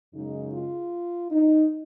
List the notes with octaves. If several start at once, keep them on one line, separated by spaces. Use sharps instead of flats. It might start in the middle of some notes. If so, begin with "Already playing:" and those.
F#2 C#3 G#3 D#4
F4
D#4